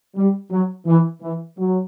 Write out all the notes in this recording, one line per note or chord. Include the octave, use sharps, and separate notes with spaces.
G3
F#3
E3
E3
F#3